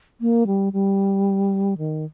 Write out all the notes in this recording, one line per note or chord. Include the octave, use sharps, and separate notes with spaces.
A#3
G3
G3
D#3